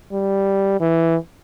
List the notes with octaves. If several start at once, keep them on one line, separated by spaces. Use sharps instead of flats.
G3
E3